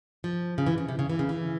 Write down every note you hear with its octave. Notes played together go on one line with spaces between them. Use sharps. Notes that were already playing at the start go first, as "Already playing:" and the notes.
F3
C#3
E3
C#3
C3
C#3
E3
C#3
E3